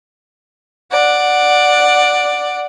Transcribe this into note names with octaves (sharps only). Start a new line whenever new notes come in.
D5 F#5